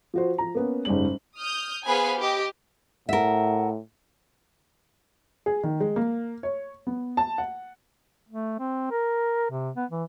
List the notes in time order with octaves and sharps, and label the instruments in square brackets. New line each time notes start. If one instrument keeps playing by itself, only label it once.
[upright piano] F3 F#4 C5
F3 A#5
A#3 B3 C#4
F#1 G#2 G3 C#4 F#7
[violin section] D#6 F6 G6
B3 G#4 B4 C5 F5 G#5
G4 D#5
[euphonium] A2 [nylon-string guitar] A#4 E5 [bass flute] F#5
[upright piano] G#4
D#3
G#3
A#3
C#5
B3
A5
F#5
[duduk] A3
C4
A#4
C3
B3
E3